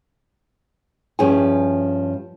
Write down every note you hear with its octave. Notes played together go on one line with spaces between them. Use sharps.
G2 F3 C#4 E4 G#4 G#5